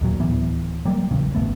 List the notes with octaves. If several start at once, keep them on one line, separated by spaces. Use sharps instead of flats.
D#2 A#2 F#3
D1 E3 B3
F#3 G3 A#3
A#1 E2 C#3
G#1 A2 A3 B3